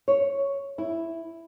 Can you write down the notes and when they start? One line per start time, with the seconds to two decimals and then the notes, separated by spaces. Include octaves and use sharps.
0.08 C#5
0.78 E4